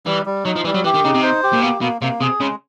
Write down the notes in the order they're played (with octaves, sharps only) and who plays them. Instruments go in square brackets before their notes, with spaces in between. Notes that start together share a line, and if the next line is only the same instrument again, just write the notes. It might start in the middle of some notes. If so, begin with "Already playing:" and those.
[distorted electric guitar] E3 [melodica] G3
[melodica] G3
[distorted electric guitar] F#3 [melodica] D#4
[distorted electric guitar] F3
[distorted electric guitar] E3 [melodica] G3
[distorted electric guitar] F#3
[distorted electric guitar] E3 [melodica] G4
[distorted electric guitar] D#3
[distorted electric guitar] C#3 [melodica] D#4
[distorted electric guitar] C3
[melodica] C5
G4
[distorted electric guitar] A#2
[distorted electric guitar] B2 [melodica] A#3
[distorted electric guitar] B2 [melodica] A#3
[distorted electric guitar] C3 [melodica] A#3
[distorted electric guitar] C3 [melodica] G#4
[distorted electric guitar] C#3 [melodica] G#3